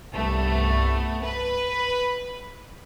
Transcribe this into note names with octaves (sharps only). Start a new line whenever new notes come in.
C2 G2 A3 B3
B4 B5